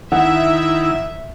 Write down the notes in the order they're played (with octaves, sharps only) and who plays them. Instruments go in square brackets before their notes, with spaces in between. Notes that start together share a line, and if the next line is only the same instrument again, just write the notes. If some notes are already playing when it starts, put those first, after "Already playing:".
[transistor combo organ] D#3 E4 [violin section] E5 [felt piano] F#5